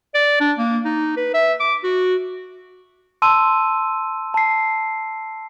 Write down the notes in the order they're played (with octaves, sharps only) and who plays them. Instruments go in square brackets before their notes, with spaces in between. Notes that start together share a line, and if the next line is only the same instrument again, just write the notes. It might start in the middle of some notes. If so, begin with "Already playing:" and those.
[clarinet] D5
D4
A#3
D#4
B4
E5
D6
F#4
[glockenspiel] A5 C6 E6 D#7
A5 C7